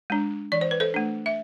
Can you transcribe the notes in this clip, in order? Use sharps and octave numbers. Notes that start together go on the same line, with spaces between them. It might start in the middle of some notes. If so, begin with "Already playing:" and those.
G#3 D4
E3 D5
C5
B4
A4 C5
A3 D4
E5